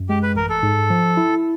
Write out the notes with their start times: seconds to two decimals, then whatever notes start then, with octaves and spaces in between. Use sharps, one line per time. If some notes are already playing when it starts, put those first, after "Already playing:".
Already playing: F#2
0.09 G#3 G4
0.23 B4
0.35 A1 A#4
0.49 A4
0.63 G#2
0.90 F3
1.17 E4